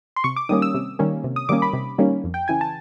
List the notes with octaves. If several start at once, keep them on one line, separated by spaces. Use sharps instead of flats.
C6
C3 C#6
D6
D#3 G3 A#3 C#4 D#6
E6
C3
D#3 G3 A#3 C#4
C3
D#6
D#3 G3 A#3 C#4 D6
B5
C3
D#3 G3 A#3 C#4
F2
G5
C#3 E3 G#5
A5